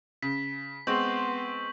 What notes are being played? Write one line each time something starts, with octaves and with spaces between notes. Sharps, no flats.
C#3 B6
G#3 B3 C4 C6 C#6 G6 F#7